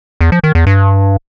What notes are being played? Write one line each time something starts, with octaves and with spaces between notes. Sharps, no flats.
E2
F3
D#3
E2
G2